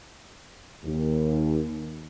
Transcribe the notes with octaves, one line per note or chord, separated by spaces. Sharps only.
D#2